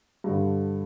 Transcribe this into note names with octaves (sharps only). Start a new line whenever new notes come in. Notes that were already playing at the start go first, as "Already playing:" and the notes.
G2 D3